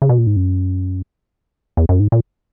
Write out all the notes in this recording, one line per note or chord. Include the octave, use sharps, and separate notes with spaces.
C#3
B2
A#2
G#2
F#2
E2
F#2
G#2
A#2